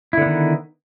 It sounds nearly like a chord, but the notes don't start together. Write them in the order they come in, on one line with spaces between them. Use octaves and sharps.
E4 D3 B3 D#3